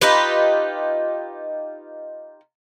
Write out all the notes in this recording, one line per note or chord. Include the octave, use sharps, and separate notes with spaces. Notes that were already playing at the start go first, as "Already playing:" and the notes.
D#4 F4 G4 B4